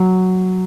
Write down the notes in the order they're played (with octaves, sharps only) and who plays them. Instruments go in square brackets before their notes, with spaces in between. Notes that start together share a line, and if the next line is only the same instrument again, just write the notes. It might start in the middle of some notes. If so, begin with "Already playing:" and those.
Already playing: [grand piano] F#3